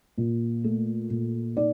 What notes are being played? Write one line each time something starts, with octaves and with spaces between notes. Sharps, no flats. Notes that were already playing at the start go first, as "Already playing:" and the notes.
A#2
A3
A#2
D#4 D5